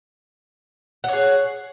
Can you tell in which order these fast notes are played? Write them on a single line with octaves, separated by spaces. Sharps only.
F#5 C#5 G#4